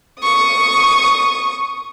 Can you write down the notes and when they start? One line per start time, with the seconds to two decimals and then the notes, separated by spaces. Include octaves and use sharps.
0.20 C#6 D#6